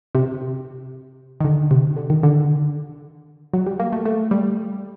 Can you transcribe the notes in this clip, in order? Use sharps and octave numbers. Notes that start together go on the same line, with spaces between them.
C3
D#3
D3
C3
D3
D#3
D3
F#3
G3
A#3
A3
A3
G3